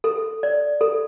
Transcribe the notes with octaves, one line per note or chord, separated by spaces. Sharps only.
A4
D5
A4